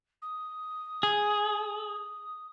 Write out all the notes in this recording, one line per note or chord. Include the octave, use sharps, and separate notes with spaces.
D#6
G#4